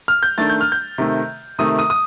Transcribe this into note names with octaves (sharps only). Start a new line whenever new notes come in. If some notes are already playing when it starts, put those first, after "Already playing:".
F6
G6
D#3 A3 D4 A6
G6
F6
G6
C3 D#3 A3
C3 D#3 A3 D#6
D#6
D#6